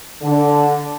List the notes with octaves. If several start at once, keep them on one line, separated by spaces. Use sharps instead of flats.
D3